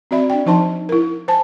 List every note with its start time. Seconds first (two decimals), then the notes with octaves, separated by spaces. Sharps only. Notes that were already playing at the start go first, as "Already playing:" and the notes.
0.11 C4 F#4 D5 E5 B5
0.30 D4 D5 G5
0.46 F3 D#4 C5 A5 C6
0.89 E4 A#4
1.28 C5 G#5 A5